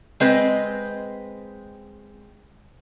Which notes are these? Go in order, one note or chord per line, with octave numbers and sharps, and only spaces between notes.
G#3 C4 B4 D#5